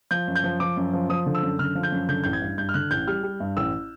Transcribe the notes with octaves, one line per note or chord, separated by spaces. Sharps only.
F3 G6
F#2
G6
F3
F3 D6
F#2
F3
F3 D#6
D3
E6
F#2
D3 F6
F3
G6
F#2
D3 G6
A1 G6
G#6
G2
G2 G6
F6
D3 F#6
A1 G6
G3 F6
G3
G2
A1 E6